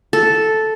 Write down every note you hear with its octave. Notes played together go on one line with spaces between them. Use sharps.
A4